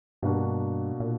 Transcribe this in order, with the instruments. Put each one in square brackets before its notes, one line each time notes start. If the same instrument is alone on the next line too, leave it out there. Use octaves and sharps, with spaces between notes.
[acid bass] G2 [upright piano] B2 A#3 D4 F#4
[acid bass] A#2